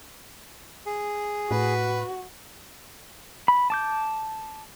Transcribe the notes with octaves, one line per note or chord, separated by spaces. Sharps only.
G#4
A2 F#4 B4
B5
A5 D6 G6